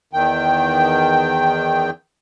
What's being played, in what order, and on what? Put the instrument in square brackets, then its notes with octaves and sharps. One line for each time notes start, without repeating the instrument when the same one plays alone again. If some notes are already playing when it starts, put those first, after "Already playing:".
[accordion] E2 D#3 G5